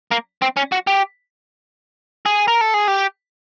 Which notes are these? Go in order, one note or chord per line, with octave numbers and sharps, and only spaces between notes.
A#3
C4
C#4
F#4
G4
G#4
A#4
A4
G#4
G4